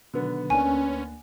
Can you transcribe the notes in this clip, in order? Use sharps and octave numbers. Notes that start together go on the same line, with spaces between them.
B2 D3 D#3 F#3 B3
D2 A#3 C#4 D4 G#5